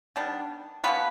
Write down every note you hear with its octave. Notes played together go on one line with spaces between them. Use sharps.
D#3 G3 B3 D4
B2 G3 A#3 B3 B4